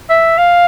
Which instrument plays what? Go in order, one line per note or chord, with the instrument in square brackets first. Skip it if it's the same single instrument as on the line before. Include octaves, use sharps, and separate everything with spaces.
[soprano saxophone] E5
F5